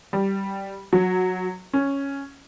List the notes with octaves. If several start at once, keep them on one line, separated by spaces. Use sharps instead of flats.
G3
F#3
C#4